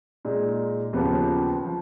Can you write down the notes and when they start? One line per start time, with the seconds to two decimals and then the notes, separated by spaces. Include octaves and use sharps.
0.25 A#2 G#3 D#4
0.93 D#2 C#3 F3 B3 F4
1.65 F3